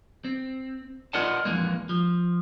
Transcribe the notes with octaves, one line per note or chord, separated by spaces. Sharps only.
C4
F4 A#4 D5 D#5 F#5 A5
F2 E3 G#3 A#3
F3